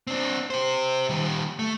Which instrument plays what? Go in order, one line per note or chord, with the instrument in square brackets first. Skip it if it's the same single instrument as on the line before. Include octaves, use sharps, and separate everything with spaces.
[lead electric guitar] C4 D4
G4 C5
D#3 G3
A3